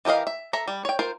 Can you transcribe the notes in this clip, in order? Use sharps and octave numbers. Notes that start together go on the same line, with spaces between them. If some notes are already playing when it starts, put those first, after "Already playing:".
E3 G4 A#4 D#5 F5
E5
A4 E5 A#5
G3
C#5 G5
F4 A#4 C5